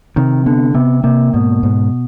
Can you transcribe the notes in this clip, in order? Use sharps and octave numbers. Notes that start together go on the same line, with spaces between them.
C3 D#3
D3 B3
C3 B3
C3 A#3
G#2 B2
G#2